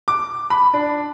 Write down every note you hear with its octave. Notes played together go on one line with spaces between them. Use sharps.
D6
B5
D4